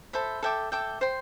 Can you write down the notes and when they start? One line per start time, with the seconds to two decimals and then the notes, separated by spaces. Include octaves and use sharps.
0.13 A4 C5 E5 B5
0.43 A4 E5 G5 D6
0.72 A4 E5 G5 D6
1.01 C5 G5 C6